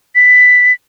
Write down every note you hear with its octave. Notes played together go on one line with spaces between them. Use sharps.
B6